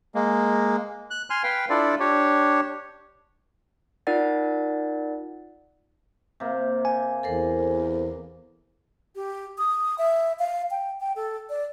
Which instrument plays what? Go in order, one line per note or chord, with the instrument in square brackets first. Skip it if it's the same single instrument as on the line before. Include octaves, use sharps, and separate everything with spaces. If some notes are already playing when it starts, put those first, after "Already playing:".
[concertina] G#3 A#3
F#6
G#5 C6 F6
B4 F5 G5
D4 E4 F4 A4 D5
D4 G4 C#5
[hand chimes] D#4 F4 A#4 D5 F#5 A6
[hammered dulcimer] C3 A#3
[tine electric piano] G#5
[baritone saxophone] E2 [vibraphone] A4 A#4 C5
[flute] G4
D#6
E5
F5
G5
G5
A4
D5